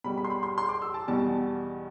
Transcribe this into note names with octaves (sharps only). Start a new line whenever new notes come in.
B2 G3 B5
B5
C6
B5
C6
C6
D6
E6
A5
E2 B2 G3 A5